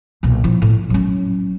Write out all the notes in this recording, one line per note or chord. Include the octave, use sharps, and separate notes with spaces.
B1 A#2
F3 E4
A2
F#3 C#4